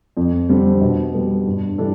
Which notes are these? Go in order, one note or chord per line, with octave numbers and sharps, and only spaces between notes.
F2
D3 G3 C4
B2
G3 B3
G2
E3 G3 D4 A4